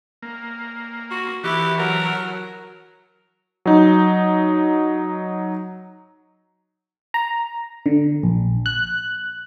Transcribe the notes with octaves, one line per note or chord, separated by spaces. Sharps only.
A#3
F#4
E3 E4 F#4 G4
F#3 A#4
F#3 D#4
A#5
D3
A#1
F#6